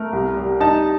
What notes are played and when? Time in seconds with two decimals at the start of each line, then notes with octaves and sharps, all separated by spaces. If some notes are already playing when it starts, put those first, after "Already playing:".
Already playing: A3 A#4
0.13 C2
0.37 G3
0.60 D#4 A5